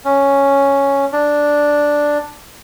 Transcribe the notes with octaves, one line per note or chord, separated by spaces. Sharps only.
C#4
D4